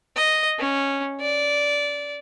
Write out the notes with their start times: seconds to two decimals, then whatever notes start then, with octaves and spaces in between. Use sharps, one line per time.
0.16 D#5
0.59 C#4
1.21 D5